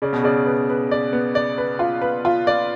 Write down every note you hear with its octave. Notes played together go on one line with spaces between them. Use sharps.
C#3 D5
B2
C#3 D5
B4
B4
D5
B3
D5
B4
F4
B4
F4
D5